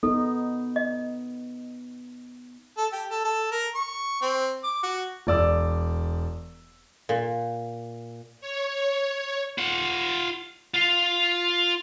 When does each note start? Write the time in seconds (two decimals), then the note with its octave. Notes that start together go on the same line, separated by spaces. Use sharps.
0.03 B3 D#4 A4
0.76 D#5
2.77 A4
2.93 G4
3.11 A4
3.24 A4
3.52 A#4
3.75 C#6
4.22 C4
4.64 D6
4.83 F#4
5.27 E1 D5 E6
7.09 A#2
8.41 C#5
9.58 F4 F#5
10.74 F4 F5